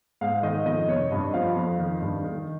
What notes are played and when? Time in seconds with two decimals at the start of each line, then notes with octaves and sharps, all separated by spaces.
0.21 G#2 F5
0.43 D#3 D#5
0.65 F2 D#5
0.88 C3 C#5
1.11 G2 D#5
1.34 F3 F5
1.56 F2
1.79 D#3
2.02 G2
2.24 D#3